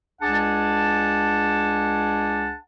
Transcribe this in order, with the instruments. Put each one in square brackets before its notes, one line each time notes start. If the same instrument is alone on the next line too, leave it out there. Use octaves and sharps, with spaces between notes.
[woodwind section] C#2 D4 G#4 F#5 G#5 A5